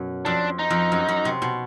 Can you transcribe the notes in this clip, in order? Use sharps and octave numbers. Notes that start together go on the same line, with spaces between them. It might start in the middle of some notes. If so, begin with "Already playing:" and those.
Already playing: F#2 B2
F2 D4
D#4
F2
F#2
F#2
C3
B2